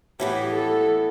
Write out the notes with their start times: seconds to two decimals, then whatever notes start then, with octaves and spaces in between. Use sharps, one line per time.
0.20 A2 E3 B3 G4
0.54 A4